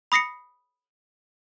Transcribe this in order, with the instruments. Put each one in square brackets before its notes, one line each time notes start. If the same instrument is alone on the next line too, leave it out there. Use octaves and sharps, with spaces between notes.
[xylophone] B5 D#6 A#6 C7 C#7